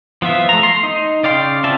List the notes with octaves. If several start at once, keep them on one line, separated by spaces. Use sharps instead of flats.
F3 B3 F4 E5
A3 A#5
C6
D#4
C#3 D5 F5 G5 C6
C4 C#4 F4 E5 A5